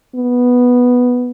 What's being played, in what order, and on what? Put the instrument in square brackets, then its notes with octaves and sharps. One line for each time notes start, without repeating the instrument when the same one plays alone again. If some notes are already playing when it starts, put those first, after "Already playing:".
[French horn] B3